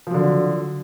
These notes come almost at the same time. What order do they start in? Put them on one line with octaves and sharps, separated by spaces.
F3 F#3 D3